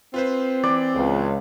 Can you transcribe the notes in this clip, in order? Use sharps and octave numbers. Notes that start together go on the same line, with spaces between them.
C4 F4 B4 C5
E3 D5
C#2